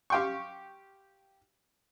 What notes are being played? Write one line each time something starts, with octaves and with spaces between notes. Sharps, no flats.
G4 F5 G5 C6 C#6